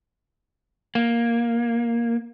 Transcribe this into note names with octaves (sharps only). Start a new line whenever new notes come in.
A#3